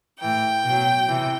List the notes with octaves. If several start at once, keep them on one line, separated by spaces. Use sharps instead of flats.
A2 E3 G5
B2
F#3
C3 E3